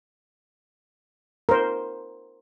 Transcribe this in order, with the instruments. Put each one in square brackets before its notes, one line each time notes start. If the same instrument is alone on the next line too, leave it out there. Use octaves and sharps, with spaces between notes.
[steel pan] A#4 C5